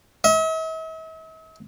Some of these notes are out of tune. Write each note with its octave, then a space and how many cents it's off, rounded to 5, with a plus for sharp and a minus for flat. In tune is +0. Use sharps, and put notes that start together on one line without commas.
E5 -45